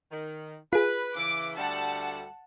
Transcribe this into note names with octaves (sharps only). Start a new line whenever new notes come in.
D#3
F4 G#4 B4
C#3 E3 D6
D2 G3 F#5 A5